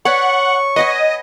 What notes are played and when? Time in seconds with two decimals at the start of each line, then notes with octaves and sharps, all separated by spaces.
0.05 B4 C#5 D5 F#5 C#6
0.76 B4 D#5 F#5 G#5